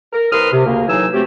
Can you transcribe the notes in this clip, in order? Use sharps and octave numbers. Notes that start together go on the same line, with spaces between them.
A#4
C2 A#4 B4 C6 D#6 F6
C3
D2 C#3 A#3
A2 E3 F#3 D#4 G#5 E6
F3 F#3 A3 C4 G4